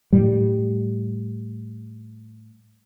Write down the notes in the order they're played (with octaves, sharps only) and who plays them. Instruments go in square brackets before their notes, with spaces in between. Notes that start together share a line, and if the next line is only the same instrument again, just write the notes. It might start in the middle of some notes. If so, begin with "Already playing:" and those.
[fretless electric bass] A2 G3